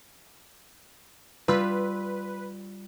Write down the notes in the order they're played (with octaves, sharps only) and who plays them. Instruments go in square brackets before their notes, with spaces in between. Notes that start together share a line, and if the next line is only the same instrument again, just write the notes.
[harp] G3 F4 E6 [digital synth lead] B4